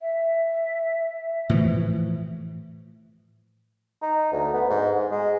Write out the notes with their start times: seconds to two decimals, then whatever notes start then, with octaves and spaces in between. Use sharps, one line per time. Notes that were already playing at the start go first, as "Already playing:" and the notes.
0.02 E5
1.49 A2 E3 F3
4.02 D#4
4.32 D2
4.53 B3
4.70 G#2
4.95 G#2
5.11 G#3